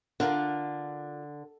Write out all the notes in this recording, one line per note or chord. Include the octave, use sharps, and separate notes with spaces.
D3 D4 F4 A#4